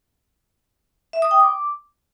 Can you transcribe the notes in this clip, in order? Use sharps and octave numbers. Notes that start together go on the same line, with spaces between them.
E5
D#6
G5
D6